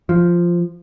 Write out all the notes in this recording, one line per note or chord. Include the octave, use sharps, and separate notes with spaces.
F3